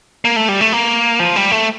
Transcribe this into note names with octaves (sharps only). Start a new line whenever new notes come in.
A#3
A3
G3
A3
A#3
F3
G3
A3